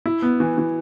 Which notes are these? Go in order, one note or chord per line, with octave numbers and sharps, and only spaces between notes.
E4
B3
E3
E3